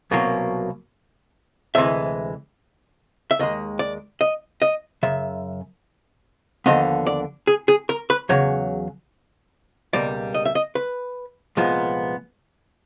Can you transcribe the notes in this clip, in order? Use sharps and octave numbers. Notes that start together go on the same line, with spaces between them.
C2 B2 F#3 A#3
D2 C3 E3 G#3 E5
E5
D#2 D#3 G#3 D#5
D5
D#5
D#5
F#2 C#3 E5
D#2 D3 F3 B3 D#5
D5
G#4
G#4
A#4
B4
E2 C#3 F#3 C#5
C#2 B2 G3 A#3 D5
D#5
E5
D#5
B4
C2 A#2 F3 G#3 B3